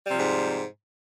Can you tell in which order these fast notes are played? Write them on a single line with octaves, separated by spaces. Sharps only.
G3 C3 F3 G#2